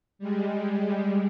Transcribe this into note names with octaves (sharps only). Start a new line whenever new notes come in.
G3 G#3